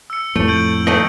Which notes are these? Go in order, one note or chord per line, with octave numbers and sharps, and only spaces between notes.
E6 C#7
F2 A2 A3
G6 D7 F#7
D#3 A3 D#5